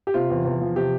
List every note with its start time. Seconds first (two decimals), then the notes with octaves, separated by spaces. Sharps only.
0.07 G4
0.14 C3 F4
0.30 E2
0.45 E2
0.61 F3
0.76 C3 G4